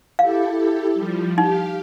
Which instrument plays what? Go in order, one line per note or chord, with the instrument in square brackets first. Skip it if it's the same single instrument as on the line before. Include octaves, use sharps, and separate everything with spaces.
[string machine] E4 G4 A4 [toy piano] F5
[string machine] F3 G3
[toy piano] D#4 [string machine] G4 F5